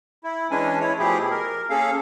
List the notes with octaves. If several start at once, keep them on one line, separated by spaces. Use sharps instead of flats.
E4
E3 G#3 C#4 D4 G#5
E4 C#5
B2 F3 A3 E4 G4 G#4
A#4
A#3 C#4 G#4 A4 F5